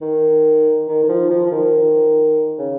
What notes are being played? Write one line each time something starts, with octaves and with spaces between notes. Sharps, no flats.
D#3
D#3
D#3
F3
F3
F3
D#3
C#3